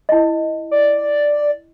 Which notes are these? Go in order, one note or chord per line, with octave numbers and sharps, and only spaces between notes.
E4 D#5
D5